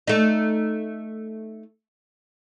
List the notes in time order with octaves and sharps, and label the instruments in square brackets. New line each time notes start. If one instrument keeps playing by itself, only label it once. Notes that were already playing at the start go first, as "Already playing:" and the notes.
[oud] A3 D#4